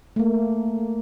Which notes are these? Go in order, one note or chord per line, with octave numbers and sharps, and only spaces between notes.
A3 A#3